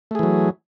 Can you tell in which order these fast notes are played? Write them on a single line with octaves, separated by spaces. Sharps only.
A3 G#4 E3 F#3